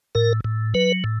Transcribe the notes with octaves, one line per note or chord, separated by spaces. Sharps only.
A2 A#4
A2
F#3 B4
A2